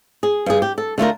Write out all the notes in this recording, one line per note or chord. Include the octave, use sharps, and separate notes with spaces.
G#4
G2 G#4
G4
A4
D3 A3 F4 A#4